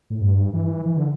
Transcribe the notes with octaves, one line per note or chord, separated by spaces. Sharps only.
A2
G2
E3
E3
D3